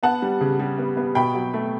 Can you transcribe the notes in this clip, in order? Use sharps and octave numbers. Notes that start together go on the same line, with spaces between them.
B3 F#5 A5
G3
C#3
G3
B3
B3
B2 G5 B5
F#3
A3